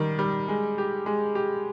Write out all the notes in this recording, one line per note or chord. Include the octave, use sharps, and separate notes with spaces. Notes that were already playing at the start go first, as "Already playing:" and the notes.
Already playing: D#3 G3
G3
G#3
G4
G#3
G4